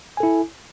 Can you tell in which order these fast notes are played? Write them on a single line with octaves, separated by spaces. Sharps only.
G#5 A4 E4